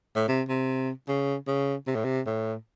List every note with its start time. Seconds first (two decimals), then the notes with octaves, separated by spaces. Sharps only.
0.16 A2
0.28 C3
0.49 C3
1.08 C#3
1.47 C#3
1.87 C3
1.95 A2
2.05 C3
2.26 A2